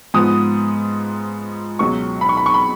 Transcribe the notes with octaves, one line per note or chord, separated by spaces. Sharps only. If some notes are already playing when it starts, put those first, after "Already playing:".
G#2 F3 B3 D#6
C#2 B2 F#3 C#6
B5
C#6
B5
C#6
B5